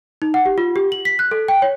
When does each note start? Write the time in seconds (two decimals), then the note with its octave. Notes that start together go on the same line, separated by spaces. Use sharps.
0.22 D#4
0.34 F#5
0.46 G4
0.58 F4
0.76 G4
0.92 F#7
1.05 B6
1.19 F#6
1.31 A4
1.48 G5
1.62 C#5